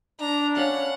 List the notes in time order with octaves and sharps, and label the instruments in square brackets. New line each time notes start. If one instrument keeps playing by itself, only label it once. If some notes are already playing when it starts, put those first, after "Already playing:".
[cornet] D4 [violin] A#5
[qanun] C#4 F5 B5 [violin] F#5